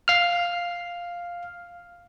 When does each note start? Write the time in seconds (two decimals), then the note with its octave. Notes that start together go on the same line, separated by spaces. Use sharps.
0.08 F5 F6